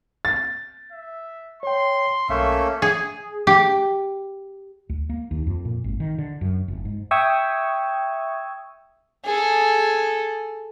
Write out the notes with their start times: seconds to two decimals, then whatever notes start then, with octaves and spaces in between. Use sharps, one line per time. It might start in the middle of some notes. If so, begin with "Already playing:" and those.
0.25 A6
0.92 E5
1.63 C#5 G5 C6
2.29 B1 A3 A#3 C#4 E5 C#6
2.82 G#4
3.47 G4
4.89 D2
5.10 A#3
5.31 D#2
5.47 F2
5.65 A#2
5.84 G#1
6.00 D#3
6.18 D3
6.41 F#2
6.68 F1
6.85 G#2
7.11 E5 G5 C#6 D#6 E6 G#6
9.25 G#4 A4